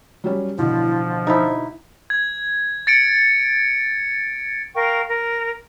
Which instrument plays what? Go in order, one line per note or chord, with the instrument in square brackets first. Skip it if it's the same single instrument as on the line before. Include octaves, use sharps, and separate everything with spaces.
[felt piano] F#3 G3 C#4
[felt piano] A1 B2 D3 [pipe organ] F3 [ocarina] E4
[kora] D#4 E4 [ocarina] C5
[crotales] G#6
A6 C#7 D7
[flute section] A#4 F5 G5 C#6
A#4